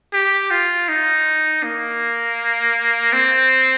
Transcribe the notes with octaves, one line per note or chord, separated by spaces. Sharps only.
G4
F4
D#4
A#3
C4